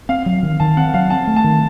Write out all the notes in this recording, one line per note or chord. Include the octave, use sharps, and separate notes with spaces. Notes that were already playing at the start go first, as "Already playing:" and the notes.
C4 F5
F#3
D#3
D#3 A5
C4 F#5
F#3 F5
C4 A5
A3
A5
D#3